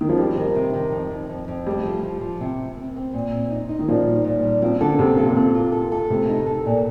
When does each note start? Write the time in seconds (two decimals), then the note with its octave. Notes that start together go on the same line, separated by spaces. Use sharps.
0.01 D#3
0.09 F3
0.18 F2 G3
0.37 D#3
0.55 C3
0.73 D#3
0.92 F2
1.11 F2
1.30 F2
1.48 F2
1.67 G3 A3
1.85 F3
2.03 F3
2.21 F3
2.41 C3
2.59 C4
2.77 C4
2.96 C4
3.13 A#2
3.32 C4
3.50 D#4
3.69 D#4
3.79 D#3
3.88 A#2 F3
4.07 G3
4.24 A#2
4.43 G3
4.62 F3 C4
4.81 D3 A4
4.99 C3 F3
5.17 A#2 A4
5.28 C3
5.36 A#2 C4
5.55 F4
5.72 A4
5.92 A4
6.10 C3 A3
6.29 D#4
6.46 A4
6.66 A#2